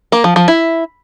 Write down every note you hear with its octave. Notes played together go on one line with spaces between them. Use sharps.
A#3
F3
F3
E4